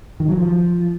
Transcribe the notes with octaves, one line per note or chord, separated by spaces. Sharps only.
D#3
F#3
F3